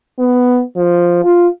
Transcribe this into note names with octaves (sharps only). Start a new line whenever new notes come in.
B3
F3
F4